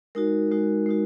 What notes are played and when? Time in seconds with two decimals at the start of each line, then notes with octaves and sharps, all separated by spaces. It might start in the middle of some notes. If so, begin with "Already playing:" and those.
0.15 G#3 D#4 F#4 A#4
0.51 G#3 D#4 F#4
0.86 G#3 D#4 F#4